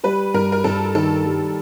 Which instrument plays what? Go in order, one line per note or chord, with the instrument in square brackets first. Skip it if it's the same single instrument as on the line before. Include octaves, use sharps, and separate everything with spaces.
[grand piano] G3 [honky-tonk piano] B4
[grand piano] G2 [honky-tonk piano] A#4
[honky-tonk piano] A#4
[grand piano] G2 [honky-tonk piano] A4
[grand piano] D#3 [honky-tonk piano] A4
[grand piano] G3